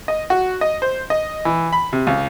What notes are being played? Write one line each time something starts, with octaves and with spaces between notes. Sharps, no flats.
D#5
F#4
D#5
C5
D#5
E3
B5
C3
C#2